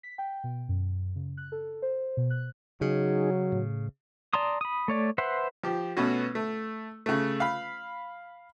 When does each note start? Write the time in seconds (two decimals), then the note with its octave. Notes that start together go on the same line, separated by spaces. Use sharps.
0.03 B6
0.18 G5
0.44 B2
0.69 F#2
1.16 C#3
1.37 F#6
1.52 A4
1.82 C5
2.17 B2
2.30 F#6
2.81 C#3 F#3 D#4 G#4
3.52 A2
4.33 D5 A5 A#5 C6 D#6
4.61 B5 D#6
4.88 A3 C#5 D5
5.18 B4 C5 E5 F#5 C6
5.63 F3 G4
5.97 B2 A3 B3 C#4 F#4
6.35 A3
7.06 C#3 A3
7.40 F5 B5